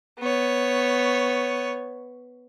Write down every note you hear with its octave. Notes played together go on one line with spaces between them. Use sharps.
B3 C#5